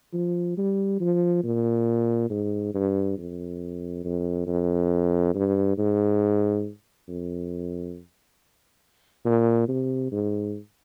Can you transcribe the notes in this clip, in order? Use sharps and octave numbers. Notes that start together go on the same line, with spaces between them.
F3
G3
F3
A#2
G#2
G2
F2
F2
F2
G2
G#2
F2
A#2
C3
G#2